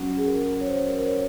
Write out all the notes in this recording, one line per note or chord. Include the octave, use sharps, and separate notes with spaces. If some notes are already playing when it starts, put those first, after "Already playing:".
Already playing: F#3 C#4 F#4
G#4
A#4
C#5
C5
A#4
C5
C#5